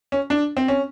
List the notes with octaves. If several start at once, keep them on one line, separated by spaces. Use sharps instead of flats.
C#4
D4
C4
C#4